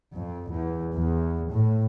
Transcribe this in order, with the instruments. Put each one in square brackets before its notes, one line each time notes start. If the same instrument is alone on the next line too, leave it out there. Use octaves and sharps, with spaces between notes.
[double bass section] F2
E2
E2
A2